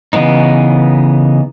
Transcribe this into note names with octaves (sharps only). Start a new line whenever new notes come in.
C#3 E3 B3 D#4